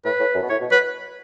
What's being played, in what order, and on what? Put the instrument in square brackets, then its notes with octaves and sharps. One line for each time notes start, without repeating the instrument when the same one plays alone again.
[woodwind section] A2 [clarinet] B4
[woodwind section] A2
F#2
B2
[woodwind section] A2 [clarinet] C#5
[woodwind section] B2
[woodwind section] F#3 [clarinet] B4